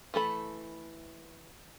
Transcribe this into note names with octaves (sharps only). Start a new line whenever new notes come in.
E3 A3 A4 B5